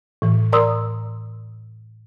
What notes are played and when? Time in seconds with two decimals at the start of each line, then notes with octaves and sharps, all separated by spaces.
0.22 A2 E3
0.53 A#4 D5 A#5 C6 D#6 E6